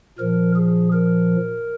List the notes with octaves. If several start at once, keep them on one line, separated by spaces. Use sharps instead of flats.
A#2 F3 A#4
G#4
A#4